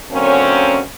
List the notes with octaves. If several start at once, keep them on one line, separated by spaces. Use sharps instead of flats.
F#2 D3 A#3 C4 C#4